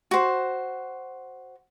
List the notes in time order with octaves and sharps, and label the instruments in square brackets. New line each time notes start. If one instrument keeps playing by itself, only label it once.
[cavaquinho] F#4 C5